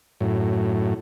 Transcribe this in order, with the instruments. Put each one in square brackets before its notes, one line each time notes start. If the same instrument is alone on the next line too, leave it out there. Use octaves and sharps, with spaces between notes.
[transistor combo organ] F#2 A2